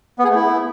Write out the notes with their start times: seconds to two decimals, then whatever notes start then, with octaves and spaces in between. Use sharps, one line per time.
0.19 B3
0.24 G#4
0.30 A3
0.35 E4